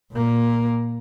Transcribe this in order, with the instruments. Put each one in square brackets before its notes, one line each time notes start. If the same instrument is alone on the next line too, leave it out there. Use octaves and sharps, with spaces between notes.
[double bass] A#2 A#3